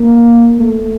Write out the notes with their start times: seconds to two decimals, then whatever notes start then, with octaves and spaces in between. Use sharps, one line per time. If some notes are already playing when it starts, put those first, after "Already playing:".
Already playing: A#3
0.59 A3